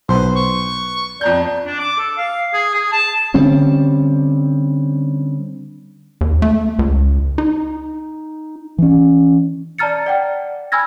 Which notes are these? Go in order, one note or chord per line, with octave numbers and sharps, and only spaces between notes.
B1 B4 C5 C6
C#6
F2 D5 A#5 G6
D4
D6
A4
F5
G#4
G#4
A5
D3 G3 C4 C#4
D#2
A3
C#2
D#4
E3 C#4
D5 A5 A#5 F6 A6 C#7
D5 F#5 G5
G#5 B5 E6 F6 G#6 A#6